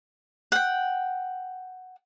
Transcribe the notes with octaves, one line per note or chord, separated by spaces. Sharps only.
F#5 G5